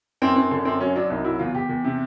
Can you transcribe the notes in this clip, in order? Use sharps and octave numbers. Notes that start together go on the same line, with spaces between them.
F#2 C4
F#2 C4
D3
F#2 C4
F#3 C#4
F#3 D4
C2 D#4
F#3 E4
E2 F4
E2 G4
E2
C3